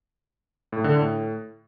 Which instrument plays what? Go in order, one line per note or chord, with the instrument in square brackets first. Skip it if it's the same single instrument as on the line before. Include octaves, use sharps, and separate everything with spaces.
[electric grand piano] A2
D3
A2